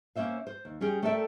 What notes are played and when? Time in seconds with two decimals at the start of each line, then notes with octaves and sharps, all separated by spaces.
0.16 A#3 C#4 C5 E5 F5
0.47 C5
0.65 D#2
0.81 G3 C#4 G#4 G5
1.03 A3 A4 A#4 D5 E5 G5